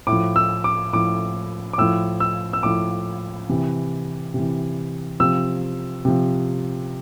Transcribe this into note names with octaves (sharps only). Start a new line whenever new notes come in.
A2 D6
F3
E6
D6
A2 F3 D6
D6
A2 F3 E6
E6
E6
A2 F3 D6
C3 E3
C3
E3
C3 F3 E6
C3 F3